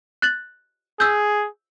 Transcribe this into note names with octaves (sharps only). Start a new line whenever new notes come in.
F#6 A6 F#7
G#4 E6 G6